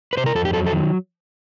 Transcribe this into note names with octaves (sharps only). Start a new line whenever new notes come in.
B4
C3 C5
A#4
F2 A4
G4
F#3 A4
A4
D#3